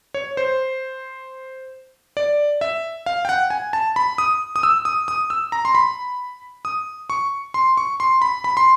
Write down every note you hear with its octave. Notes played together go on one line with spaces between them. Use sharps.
C#5
C5
D5
E5
F5
G5
F#5
G#5
A5
B5
D#6
D#6
E6
D#6
D#6
E6
A#5
C6
B5
D#6
C#6
C6
C#6
C6
B5
B5
C6